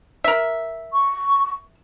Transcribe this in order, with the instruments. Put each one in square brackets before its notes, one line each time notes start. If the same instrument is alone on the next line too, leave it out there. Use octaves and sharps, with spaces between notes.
[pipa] A#4 E5
[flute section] C#6